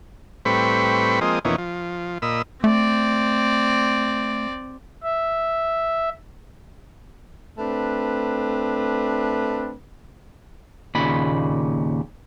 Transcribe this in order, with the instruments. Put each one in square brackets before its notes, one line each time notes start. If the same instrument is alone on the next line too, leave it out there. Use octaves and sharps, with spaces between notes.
[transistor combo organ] A2 G3 C4 B4 B5 C#6
F3 G#3 A#3 C4 D#5
F2 B2 E3 A#3 C#4 D#4
F3
A#2 D#5 B5 E6
[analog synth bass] A3 [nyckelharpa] C4 D5
[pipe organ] E5
[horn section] A3 C4 D4 B4
[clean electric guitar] D#2 A#2 C#3 B5